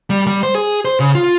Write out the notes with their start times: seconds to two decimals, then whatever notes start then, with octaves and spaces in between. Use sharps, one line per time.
0.10 G3
0.27 G3
0.43 C5
0.55 G#4
0.85 C5
1.00 C#3
1.15 F4